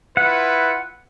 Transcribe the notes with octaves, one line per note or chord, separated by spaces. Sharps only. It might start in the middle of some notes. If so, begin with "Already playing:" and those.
E4 F4 B4 F#5